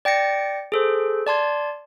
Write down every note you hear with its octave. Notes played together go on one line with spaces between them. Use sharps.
D5 G5 A6 A#6 C#7
G#4 A4 C5
D5 A5 C6 G#6